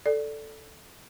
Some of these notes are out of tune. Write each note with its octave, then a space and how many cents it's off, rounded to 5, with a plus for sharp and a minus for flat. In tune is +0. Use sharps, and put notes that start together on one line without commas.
A4 +0 D5 +0